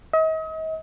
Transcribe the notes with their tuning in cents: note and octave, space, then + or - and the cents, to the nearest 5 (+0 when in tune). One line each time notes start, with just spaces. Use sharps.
D#5 +40